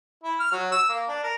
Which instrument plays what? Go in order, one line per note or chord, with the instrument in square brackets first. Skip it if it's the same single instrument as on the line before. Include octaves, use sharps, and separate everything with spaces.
[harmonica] E4
F6
F#3
E6
A#3
D4
A#4